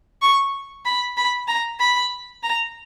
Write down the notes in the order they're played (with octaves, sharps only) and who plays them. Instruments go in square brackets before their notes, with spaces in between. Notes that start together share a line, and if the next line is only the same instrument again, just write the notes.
[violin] C#6
B5
B5
A#5
B5
A#5